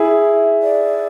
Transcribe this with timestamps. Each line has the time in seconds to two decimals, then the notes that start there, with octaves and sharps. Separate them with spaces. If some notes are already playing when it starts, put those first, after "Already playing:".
Already playing: E4 G#4 E5
0.63 D5